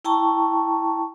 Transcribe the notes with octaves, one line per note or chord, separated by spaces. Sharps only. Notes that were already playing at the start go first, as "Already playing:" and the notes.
E4 G5 A5 A#5 C#6